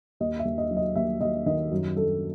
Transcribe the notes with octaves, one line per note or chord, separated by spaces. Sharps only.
D#2 D#5
E5
D#2
D#5
F#3
D#5
D#2 E5
D#2 D#5
D#3 D#5
F#2
F#2 A4